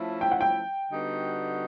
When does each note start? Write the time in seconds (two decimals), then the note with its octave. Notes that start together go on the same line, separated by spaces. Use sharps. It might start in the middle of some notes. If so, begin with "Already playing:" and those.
Already playing: F3 A3 C#4 E4
0.21 G5
0.32 F#5
0.41 G5
0.91 D3 G3 B3 D#4 F#4